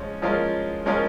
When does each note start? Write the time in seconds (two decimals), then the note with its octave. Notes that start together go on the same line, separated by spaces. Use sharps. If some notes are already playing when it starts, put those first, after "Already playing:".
Already playing: F3 G#3 C#4
0.22 F3 G#3 C#4 F4 A#4
0.86 F3 G#3 C#4 F4 A#4